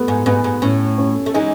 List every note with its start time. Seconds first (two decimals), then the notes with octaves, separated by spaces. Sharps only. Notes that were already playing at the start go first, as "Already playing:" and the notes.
Already playing: A3 B3
0.08 G#2
0.26 G#2 B3
0.44 G#2
0.62 A2 C#4
0.98 C#4
1.26 A3
1.34 E3 G#3 D#4